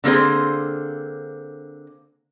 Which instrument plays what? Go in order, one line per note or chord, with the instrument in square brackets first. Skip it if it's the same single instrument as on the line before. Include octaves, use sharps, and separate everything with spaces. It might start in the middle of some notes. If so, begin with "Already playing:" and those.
[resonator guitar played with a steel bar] D3 A#3 C4 G#4 C5